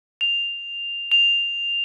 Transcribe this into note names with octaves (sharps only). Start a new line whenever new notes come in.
F7
F7